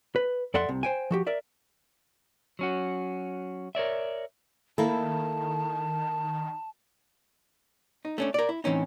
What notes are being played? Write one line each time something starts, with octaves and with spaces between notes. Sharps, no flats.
B4
F2 A4 D5 E5 F#5 C6
C2 C3
C5 G5 G#5
F3 F#4 G4
A#4 D5 E5
F#3 C#4 F#4
A#4 C#5 D5 E5
D#3 A#3 E4 A4 A5
D#4
A3 C#4 D4
A#4 D5
E4
A2 E3 C4 C#4 D#4